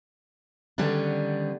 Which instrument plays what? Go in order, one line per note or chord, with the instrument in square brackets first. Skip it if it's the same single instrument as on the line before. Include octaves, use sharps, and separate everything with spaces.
[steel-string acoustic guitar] D3 D#3 G3 B3 C#4 D4